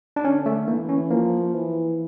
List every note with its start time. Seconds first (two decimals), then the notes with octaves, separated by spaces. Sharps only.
0.16 D4
0.24 D3 C#4
0.46 A3
0.67 E3 A#3
0.89 C#4
1.11 F3 A#3
1.54 E3